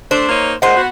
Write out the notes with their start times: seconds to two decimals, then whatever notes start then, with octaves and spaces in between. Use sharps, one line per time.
0.11 A3 D4 C5
0.29 A#3 D#4 C#5
0.62 A#2 G#3 C5 F#5
0.76 B3 F#4